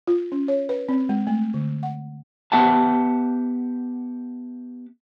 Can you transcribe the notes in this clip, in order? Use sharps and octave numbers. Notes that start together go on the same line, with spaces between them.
F4
C#4
C#5
B4
C4
G#3
A3
D3
F#5
B3 G4 E5 F#5 A5